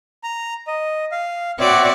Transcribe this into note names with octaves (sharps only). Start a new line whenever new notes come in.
A#5
D#5
F5
C4 F#4 C#5 D5 E5